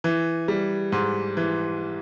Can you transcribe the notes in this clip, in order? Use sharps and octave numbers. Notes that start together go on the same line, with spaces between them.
E3
G3
G#2
E3